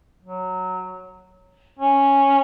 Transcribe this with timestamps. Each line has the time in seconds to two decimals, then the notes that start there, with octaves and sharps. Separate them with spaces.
0.22 F#3
1.79 C#4